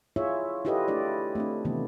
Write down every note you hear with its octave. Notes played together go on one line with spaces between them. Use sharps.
E4 F4 G#4 C#5 E5
E4 F4 G4 A4 B4 D#5
A3 D4 E4 D5
A3 C4 D4
C3 D#3 E3 A3 B3